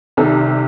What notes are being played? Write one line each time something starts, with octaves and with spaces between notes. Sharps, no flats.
C2 C3 D#3 A4